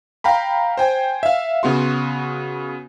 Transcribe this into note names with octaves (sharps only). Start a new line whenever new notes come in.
F5 G5 A#5 B5
C5 G5 G#5
E5 F5
C#3 B3 F#4 C6